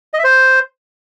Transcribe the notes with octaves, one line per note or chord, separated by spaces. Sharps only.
D#5
E5
C5